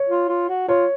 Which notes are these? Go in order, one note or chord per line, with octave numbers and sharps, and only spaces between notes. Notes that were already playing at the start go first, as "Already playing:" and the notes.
Already playing: C#5
F4
F4
F#4
F4 C#5